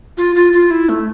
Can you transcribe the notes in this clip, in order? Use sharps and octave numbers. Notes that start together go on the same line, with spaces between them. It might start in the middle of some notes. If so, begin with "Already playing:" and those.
F4
F4
F4
E4
A3